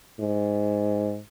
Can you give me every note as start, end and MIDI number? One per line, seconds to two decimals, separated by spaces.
0.20 1.19 44